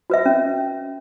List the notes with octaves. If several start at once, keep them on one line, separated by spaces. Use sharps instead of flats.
F#4 B4 E5
C#4